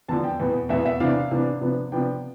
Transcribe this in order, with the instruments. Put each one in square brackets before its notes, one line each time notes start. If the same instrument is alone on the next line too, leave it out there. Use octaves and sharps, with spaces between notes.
[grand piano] E2 D3 F3 A5
G5
E2 B2 B3
E2 B2 B3 E5
E5
C3 E3 B3 D4 F5
C3 E3 B3 D4
C3 F3 B3 D4
C3 F3 B3 D4 G5